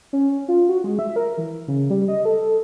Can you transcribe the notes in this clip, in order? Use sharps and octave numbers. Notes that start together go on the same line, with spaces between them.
C#4
F4
F#4
G#3
E5
A#4
E3
C#3
G3
D#5
A4